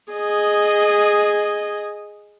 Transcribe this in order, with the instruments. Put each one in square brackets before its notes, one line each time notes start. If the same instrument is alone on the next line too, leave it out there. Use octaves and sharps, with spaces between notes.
[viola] G#4 D#5